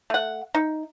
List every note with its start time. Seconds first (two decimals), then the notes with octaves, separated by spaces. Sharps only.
0.10 A3 F#5
0.55 D#4